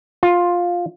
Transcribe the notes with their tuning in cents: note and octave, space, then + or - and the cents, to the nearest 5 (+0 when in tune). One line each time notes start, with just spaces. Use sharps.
F4 +10